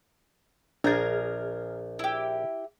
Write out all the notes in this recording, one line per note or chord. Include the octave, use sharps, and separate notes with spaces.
A#1 D4 G#4 A#4 G6 A6
E4 G4